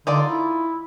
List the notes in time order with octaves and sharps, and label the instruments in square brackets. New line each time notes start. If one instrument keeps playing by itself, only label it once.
[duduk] D3 [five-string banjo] D#4 F4 D5
[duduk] E4